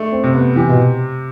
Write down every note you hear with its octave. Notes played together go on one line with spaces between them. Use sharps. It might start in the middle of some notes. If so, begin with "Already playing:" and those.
Already playing: A3 D4
C4
C3
B3
E3 G4
B2